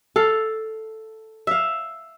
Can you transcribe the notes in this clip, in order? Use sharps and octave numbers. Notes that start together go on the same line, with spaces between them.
A4 F5
E5 F5